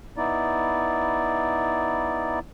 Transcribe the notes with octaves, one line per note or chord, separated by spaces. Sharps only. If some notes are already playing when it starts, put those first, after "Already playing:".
B3 D#4 E4 D5